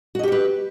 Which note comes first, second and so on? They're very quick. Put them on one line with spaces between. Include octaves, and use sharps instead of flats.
F#4 D#5 G4 C#5 B4